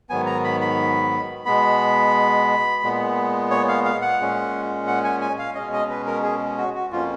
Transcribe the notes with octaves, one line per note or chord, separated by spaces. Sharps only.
G#2 D#3 F#3 B3 G#5
A#5
B5
B5
B2 G#3 B3 B5
A#2 G#3 B3
C#5
F5
F5
F#5
A#2 G#3 C#4
F#5
G#5
G#5
F5
B2 G#3 C#4 D#5
D#5
B4
A#4
G#4
F#4
F#4
F2 F3 A#3 C#4 F4